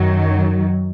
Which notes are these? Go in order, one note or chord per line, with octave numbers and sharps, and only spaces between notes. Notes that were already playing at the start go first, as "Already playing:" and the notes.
Already playing: F#2 D#3 F#3